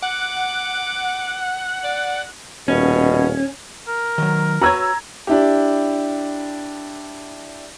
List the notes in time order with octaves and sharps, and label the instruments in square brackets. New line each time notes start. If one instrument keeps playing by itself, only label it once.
[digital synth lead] F#5 [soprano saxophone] D6
[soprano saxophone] D5
[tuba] D#1 [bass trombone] B2 [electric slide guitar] C#4
[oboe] A#4
[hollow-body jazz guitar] D#3 F#3
[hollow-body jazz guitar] F#4 B4 C#5 [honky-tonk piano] A#5 E6 G#6
[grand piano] D4 E4 G4